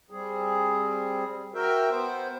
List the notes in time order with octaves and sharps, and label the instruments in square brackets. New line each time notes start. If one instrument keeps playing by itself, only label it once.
[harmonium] G3 C4 G#4
F#4 A#4 E5 G5
B3 C5